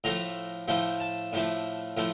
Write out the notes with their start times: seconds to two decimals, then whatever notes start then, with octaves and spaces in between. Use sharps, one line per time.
0.04 A2 F3 A3 A#5
0.68 A2 F3 A3 G5
1.00 A5
1.33 A2 F3 A3
1.97 A2 F3 A3